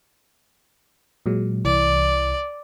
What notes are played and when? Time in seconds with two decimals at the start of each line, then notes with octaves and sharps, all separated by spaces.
1.26 A#2 F#3 G#3
1.65 C2 E3 D5